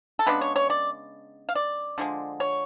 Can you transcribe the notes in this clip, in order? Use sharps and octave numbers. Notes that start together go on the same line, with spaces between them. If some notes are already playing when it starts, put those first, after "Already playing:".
A4
C#3 G#3 B3 D4 B4
C#5
C#5
D5
F5
D5
D3 F3 G#3
C#5